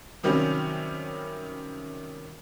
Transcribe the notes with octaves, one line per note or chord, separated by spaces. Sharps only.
C3 D#3 F#3 G3 A#3 C#4